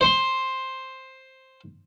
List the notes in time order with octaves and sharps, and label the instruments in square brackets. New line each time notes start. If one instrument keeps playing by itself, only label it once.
[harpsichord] C5 C6